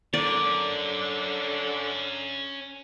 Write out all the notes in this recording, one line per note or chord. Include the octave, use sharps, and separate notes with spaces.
D3 C#4 A#4 D5